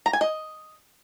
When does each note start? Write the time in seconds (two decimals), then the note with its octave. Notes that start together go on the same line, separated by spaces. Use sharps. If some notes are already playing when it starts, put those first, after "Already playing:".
0.06 A#5
0.13 G#5
0.21 D#5